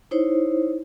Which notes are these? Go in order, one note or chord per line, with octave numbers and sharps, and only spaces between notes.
D#4 E4 C5 C#5